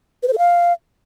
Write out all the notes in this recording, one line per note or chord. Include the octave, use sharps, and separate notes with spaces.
B4
C5
A4
F5